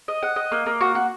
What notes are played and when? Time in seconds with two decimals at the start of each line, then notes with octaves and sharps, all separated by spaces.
0.08 D#5
0.23 F#5
0.36 D#5
0.52 A#3
0.66 A#3
0.81 F#4
0.95 F#4